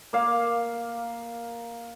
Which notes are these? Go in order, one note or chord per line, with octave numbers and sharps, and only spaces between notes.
A#3 F5